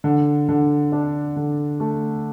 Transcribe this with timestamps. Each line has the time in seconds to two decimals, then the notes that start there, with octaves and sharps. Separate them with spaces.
0.04 D3
0.49 D3
0.92 D4
1.36 D3
1.80 A3